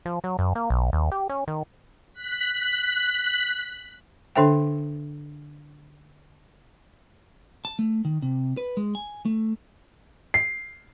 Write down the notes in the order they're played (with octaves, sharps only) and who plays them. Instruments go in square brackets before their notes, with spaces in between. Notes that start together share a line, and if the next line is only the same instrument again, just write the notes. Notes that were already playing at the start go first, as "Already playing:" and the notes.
[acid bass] F3
F#3
F#2
A#3
B1
D#2
G4
C#4
D#3
[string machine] F#6 B6
[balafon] D3 D4 A4 C5 E5 G5
[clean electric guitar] A5
A3
D#3
C3
B4
G#3
G#5
A3
[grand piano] C7